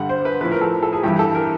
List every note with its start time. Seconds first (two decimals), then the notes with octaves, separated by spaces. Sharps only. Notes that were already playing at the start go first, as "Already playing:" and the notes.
Already playing: G2 D3 G3 F#5
0.09 C5
0.25 B4
0.41 A2 F3 B4
0.51 A#4
0.61 A4
0.83 A4
0.93 G#4
1.03 G2 E3 G3 G4
1.19 A4
1.35 A#4